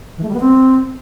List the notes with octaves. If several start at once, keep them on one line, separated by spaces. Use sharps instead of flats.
E3
A3
G3
B3
C4